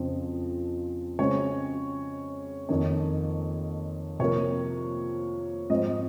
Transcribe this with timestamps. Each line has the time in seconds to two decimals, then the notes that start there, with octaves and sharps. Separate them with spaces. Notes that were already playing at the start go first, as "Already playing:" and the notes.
Already playing: F2 C#3 F3 C4
1.19 C#3 G#3 C4 C#5
2.69 F2 D#3 A#3 C#5
4.19 C3 F3 A#3 C#5
5.70 G#2 F3 C4 D#5